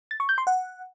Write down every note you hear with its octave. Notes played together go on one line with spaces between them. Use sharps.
A6
C#6
G6
C6
F#5